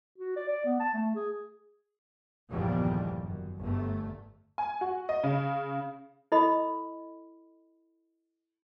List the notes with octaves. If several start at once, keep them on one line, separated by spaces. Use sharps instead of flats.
F#4
D5
D5
B3
A5
A3
G#4
G1 E2 A#2 D#3 F3 G3
F#2
G1 A3
G#5
F#4
D#5
C#3
E4 A4 D#5 B5